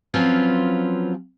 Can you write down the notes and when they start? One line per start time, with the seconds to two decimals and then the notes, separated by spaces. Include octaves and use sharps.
0.14 F3 F#3 C4 C#4 F4 B4